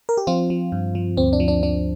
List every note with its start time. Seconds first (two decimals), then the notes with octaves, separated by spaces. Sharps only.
0.09 A#4
0.17 G4
0.27 F3 C4 F4
0.50 F3
0.72 G2
0.95 F3
1.17 D2 C4
1.33 D4
1.40 F3
1.48 D4
1.63 F3 D4